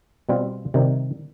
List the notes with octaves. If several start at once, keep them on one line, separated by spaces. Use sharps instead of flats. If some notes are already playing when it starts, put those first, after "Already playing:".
B2 G3 C4 F4
C3 D#3 G3